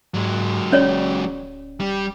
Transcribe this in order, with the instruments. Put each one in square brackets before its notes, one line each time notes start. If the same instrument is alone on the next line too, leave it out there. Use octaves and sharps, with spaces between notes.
[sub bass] G#2 [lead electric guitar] F#3 G#3
[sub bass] D1 [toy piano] C#4 C#5 D5
[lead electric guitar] G3